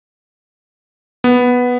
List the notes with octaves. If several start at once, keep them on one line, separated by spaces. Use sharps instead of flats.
B3